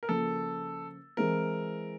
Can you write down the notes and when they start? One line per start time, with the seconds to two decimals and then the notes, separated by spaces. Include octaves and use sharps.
0.03 A#4
0.09 C#3 F3 A#3 A4
1.17 E3 G#3 C4 E4 A#4